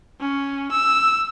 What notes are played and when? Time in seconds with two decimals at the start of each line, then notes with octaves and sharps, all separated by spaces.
0.21 C#4
0.71 E6